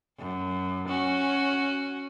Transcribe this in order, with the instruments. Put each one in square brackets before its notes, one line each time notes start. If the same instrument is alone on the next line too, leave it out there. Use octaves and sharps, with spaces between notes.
[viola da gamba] F#2
C#4 F#4